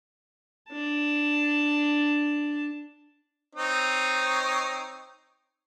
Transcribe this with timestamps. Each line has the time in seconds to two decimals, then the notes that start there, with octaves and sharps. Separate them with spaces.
0.70 D4 A5
3.55 C4 D#4 C#5